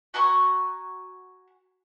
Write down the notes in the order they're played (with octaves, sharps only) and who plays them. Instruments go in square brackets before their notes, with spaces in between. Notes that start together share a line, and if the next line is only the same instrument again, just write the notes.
[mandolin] F#4 G#5 A#5 C#6